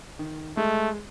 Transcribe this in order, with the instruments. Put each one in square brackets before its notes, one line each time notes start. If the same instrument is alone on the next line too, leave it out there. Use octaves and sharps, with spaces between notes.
[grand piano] D#3
[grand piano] G#3 [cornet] A3